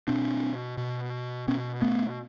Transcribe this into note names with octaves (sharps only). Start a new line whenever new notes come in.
B2 C4 D4
B2
B2 B3 C#4
A3 B3